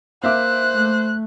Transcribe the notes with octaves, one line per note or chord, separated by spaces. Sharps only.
A#3 C5 E5 D6 F#6
A3